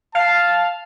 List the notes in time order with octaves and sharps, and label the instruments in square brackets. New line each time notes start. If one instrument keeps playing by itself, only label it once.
[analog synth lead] F5 [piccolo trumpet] A5